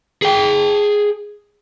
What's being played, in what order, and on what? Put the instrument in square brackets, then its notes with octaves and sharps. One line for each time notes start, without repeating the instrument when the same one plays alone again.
[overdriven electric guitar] G#4 G5